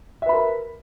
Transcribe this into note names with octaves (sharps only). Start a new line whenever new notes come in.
A#4 B4 E5 B5